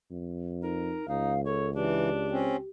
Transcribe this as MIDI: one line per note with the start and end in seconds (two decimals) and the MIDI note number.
0.11 0.96 41
0.63 1.08 63
0.63 1.03 70
1.08 2.61 37
1.08 1.33 63
1.08 1.41 77
1.46 1.70 69
1.46 1.67 73
1.75 2.10 52
1.75 2.47 62
1.75 2.69 67
2.31 2.56 60
2.31 2.56 61